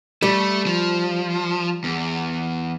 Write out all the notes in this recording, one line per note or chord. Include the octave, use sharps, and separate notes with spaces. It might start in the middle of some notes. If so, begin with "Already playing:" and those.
G3 A3
F3
E2